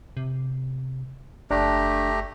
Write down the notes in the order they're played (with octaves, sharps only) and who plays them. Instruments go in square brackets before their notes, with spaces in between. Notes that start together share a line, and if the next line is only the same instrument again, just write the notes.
[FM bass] C3
[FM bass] F#1 [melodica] A3 G4 A#5 [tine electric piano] D4